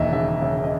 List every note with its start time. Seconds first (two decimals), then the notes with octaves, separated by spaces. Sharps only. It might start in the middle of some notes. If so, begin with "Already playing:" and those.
Already playing: E1 D#2 D#5 E5
0.12 C#3 E5
0.42 C#3 E5
0.64 D#5